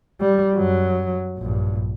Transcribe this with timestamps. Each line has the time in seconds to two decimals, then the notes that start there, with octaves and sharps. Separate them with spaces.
0.21 G3
0.55 F#2 F#3
1.38 A#1 G2